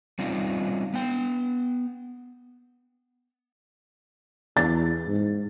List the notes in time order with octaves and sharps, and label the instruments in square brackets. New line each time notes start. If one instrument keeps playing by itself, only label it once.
[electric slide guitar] G3 C4 C#4 D#4 F4
B3 G5
[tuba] E2 [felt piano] A6
[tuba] G#2